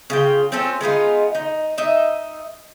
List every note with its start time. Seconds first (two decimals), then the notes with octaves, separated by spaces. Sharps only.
0.10 C#3 F4 G5
0.52 C4 C#4 F4 A4
0.81 G#3 B3 D#4 F4
1.35 D#4
1.78 D#4 E5